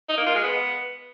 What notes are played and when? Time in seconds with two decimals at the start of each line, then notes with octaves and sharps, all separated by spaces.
0.09 D#4
0.17 A#3
0.26 F4
0.35 G#3
0.43 B3